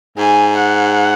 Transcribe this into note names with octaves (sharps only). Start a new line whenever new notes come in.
G#2 G#5
F#5